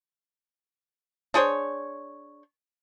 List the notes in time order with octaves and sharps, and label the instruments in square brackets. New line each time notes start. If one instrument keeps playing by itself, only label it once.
[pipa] D4 G#4 C5 C#5